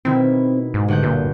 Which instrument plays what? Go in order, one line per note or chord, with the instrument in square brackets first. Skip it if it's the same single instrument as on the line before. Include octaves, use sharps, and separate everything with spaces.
[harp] B2 D#3 E4 [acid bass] C4
[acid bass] G#2
[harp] G1 F#5 G6
[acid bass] A#2